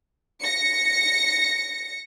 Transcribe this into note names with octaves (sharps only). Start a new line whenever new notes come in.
A#6 C#7